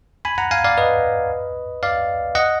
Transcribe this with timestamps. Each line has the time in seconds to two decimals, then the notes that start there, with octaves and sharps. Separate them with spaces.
0.25 G#5 B5
0.38 F#5 A#5
0.51 F5 G#5
0.64 D5 F5
0.78 B4 D#5
1.83 D5 F5
2.35 D#5 F#5